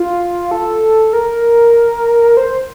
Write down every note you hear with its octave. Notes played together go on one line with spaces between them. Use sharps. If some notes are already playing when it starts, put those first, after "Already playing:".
Already playing: F4
A4
A#4
C5